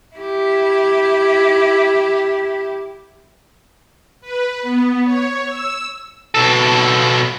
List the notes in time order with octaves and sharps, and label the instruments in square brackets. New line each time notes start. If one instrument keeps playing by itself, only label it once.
[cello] E4 G4
[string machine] B4
B3
C#5
E6
[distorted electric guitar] B2 A4